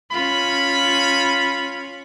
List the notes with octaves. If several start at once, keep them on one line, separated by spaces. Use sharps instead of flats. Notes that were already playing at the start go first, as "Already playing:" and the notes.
C#4 F4 B5